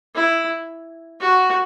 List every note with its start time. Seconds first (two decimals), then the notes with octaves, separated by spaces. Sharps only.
0.15 E4
1.20 F#4